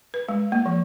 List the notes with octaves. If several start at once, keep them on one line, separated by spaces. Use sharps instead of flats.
B4
G#3
A#3
F3